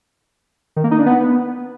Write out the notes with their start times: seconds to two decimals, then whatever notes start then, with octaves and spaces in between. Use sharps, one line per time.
0.76 D#3
0.84 A#3
0.91 D#4
0.99 D4
1.06 B3